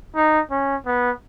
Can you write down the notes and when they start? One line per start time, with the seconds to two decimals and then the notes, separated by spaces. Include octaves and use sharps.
0.15 D#4
0.51 C#4
0.86 B3